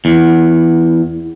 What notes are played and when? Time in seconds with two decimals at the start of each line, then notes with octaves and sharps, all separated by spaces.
0.05 E2